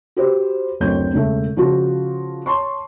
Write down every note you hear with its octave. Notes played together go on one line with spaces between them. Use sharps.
F#4 G4 B4 C5
F#1 D2 F#3 C4 C#5 G6
E1 C#3 A3 E5
C#3 F3 F4 F#4
C#5 A5 C6 C#6